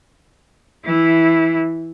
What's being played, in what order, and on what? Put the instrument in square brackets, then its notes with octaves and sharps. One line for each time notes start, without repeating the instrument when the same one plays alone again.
[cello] E3 E4